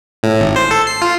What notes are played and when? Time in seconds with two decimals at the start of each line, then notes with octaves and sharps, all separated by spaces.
0.23 A2
0.40 G#1
0.56 C5
0.71 A4
0.87 C7
1.02 F4